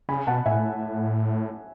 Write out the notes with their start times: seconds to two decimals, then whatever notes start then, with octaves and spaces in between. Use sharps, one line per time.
0.09 C#3 G#5 B5
0.27 B2 F#5 A5
0.46 A2 E5 G#5